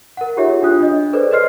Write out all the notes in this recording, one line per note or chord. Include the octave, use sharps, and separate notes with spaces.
A#4 F#5
D#4 F4 G4 G#4 C#5 E5
D4 E4 F4 D#6 F#6
D4 D#5
G#4 A4 B4 C5 D5
B4 C#5 D#5 C6 F6 C7